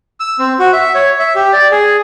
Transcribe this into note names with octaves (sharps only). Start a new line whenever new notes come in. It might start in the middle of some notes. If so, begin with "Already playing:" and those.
E6
C4
F#4
E5
C#5
E5
G4
D5
G#4